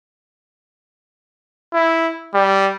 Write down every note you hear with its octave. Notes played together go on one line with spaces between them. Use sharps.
E4
G3